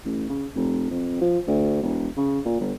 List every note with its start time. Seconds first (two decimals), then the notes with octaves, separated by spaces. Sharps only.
0.05 A1
0.29 C#3
0.56 F1
0.90 F2
1.21 F3
1.47 D2
1.82 E1
2.17 C#3
2.45 A#2
2.60 G1